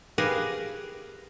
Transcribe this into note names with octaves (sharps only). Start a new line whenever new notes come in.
G4 G#4 A#4 B4 F5